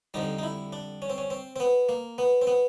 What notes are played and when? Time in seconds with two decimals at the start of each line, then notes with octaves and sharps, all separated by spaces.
0.14 F2 D3 G3 D#4
0.39 D#4
0.43 E4
0.73 D4
1.02 C#4
1.10 C4
1.18 C#4
1.30 C4
1.56 C4
1.60 B3
1.89 A#3
2.18 B3
2.42 C4
2.47 B3